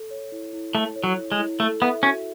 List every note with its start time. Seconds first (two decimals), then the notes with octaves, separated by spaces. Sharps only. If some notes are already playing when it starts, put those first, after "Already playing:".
Already playing: A4
0.11 C#5
0.32 E4
0.53 E4
0.75 A3 A4
0.96 C#5
1.04 F#3
1.18 E4
1.32 G#3
1.39 E4
1.60 A3 A4
1.81 B3 E5
2.03 C#4 F#4